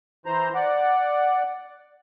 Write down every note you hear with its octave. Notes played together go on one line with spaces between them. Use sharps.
E3 C5 A#5
D5 F#5